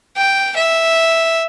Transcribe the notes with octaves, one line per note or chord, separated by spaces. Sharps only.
G5
E5